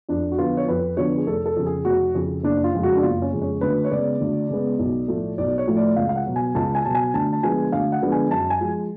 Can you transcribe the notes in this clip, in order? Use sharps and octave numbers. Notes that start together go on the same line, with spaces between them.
F2 D4
F#4
D3 F3 B3 F4
C#5
F2 B4
D3 F3 B3 C#5
G#4
F1 A4
A4
F2 C#3
G#4
F1 F#4
F2 C#3 G#4
F#1 D4
F4
F2 C#3 G#3
F#4
D4
F#1 F4
C#4
F2 C#3 G#3
C#4
D2 B4
C#5
C#3 G#3 B3 D5
D2
C#3 G#3 B3
B1
A2 F3 A3
B1 D5
C#5
A2 F3 A3
D5
C#2 F5
F5
F#5
B2 F#3
G#5
C#2 A5
G#5
B2 F#3 A5
G#5
D2 A5
A5
D3 F3 G#3 B3 G#5
D2 F5
F#5
D3 F3 G#3 B3
G#5
F#2 A5
G#5
F3 G#3